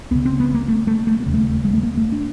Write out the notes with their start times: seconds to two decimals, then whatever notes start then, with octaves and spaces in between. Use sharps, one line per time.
0.11 C#2 C#3 B3
0.25 C4
0.40 B3
0.54 A#3
0.68 A3
0.87 A3
1.07 A3
1.20 A#3
1.26 E1 D#2 C#3
1.34 A3
1.65 G#3
1.73 A3
1.83 A#3
1.97 A3
2.12 D4